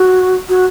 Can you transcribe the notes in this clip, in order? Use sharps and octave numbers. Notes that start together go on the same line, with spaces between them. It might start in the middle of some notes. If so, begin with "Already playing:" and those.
Already playing: F#4
F#4